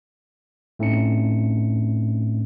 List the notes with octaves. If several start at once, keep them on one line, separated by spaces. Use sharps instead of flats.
A2 A3 C4 C#4 D#4 C#7